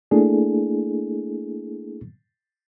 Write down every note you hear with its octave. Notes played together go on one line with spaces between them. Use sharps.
A3 A#3 D4 E4 G#4 A4